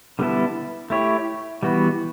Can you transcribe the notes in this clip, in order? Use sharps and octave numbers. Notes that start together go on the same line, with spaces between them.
D3 G3 B3 E4 A4
A3 E4 G4 C#5
E3 G3 B3 F#4